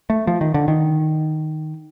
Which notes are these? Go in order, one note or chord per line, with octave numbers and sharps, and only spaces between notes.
A3
F3
D#3
D3
D#3